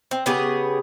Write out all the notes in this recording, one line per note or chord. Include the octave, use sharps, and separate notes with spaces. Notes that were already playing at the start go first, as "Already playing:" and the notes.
C4
C#3 B3 G4 G#4